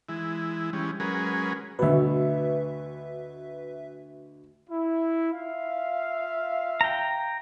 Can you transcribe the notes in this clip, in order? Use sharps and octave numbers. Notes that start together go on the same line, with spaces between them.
E3 G#3 E4
E3 G3 G#3 C#4
F#3 G#3 C#4 G#4 A#4 B4
D2 B2 B4 E5
E4
F4 E5 F5
G5 A#5